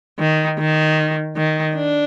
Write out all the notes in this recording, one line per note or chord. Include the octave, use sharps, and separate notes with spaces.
D#3
D#3
D#3
D4